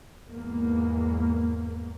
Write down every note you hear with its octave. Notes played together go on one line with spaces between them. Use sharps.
E2 G#2 A#3